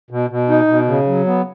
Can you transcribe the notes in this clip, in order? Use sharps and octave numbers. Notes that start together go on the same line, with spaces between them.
B2
B2
D#4
B2
C#3
F#3
B3